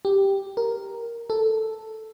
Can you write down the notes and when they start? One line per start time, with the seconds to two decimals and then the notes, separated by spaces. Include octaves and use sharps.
0.05 G4
0.57 A#4
1.30 A4